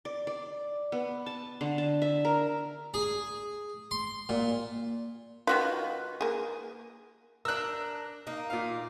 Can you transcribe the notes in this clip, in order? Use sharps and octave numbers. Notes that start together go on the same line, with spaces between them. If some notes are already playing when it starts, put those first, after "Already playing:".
D5
D5
B3
A5
D3
A5
E5
A#4
G#4
C6
A#2
D#3 F4 F#4 B4
A#3 G#4
D4 A#4 E6 F#6
A#3 D#4
A#2 F5